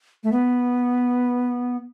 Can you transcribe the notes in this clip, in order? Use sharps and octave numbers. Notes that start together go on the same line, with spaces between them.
A3
B3